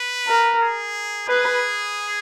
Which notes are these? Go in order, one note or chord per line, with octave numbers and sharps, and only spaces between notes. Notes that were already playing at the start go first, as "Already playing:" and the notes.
Already playing: B4
A#4
G#4
G#4 B4